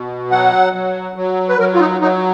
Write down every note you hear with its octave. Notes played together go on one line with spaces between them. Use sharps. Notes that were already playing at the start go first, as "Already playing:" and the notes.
Already playing: B2
F#3 F#5
F#3
F#3
B4
F#3 A#4
F4
D#4
F#3 D#4